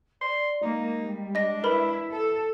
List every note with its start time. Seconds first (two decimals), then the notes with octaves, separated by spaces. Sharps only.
0.21 D5 C6
0.62 G#3 A#3 D#4
1.01 G3
1.35 D4 D#5 A#6
1.64 E4 A#4 B4 B5
2.10 A4